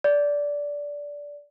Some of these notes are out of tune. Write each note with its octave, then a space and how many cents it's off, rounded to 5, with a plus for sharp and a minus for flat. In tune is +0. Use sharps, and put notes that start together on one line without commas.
D5 -15